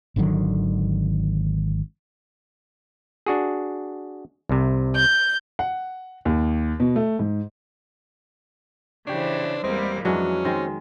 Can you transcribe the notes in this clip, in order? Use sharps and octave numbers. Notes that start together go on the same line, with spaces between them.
G#1 D3 D#3 F#3
D4 F#4 G#4
C2 C3
G6
F#5
D#2
B2
A3
G#2
C#3 E3 D4 G4 C5 C#5
E2 G3 G#3 A#3 C4 C5 D#5
F2 E3 F#3 G#3 C#4 D4
D#3 G#3 C4